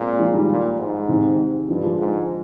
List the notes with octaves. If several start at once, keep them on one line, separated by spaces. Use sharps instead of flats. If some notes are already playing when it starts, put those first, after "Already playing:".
Already playing: A#2 G#3 C4
F3 G#3
D#3 G3
A#2
G#2
C3 D#3
G2 D3 F3
F3 G#3
G#2